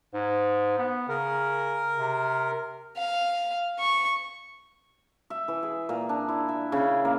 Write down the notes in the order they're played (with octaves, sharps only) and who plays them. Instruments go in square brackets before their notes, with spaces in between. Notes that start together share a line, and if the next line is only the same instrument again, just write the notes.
[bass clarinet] G#2
B3
[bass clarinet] C#3 [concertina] A#4
[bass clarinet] C3
[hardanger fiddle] F5
C#6
[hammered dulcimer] E5
E3
G#4
A#2
D4
E4
E5
C#3
A#3